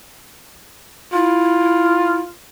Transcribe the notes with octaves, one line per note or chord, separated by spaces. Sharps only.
E4 F4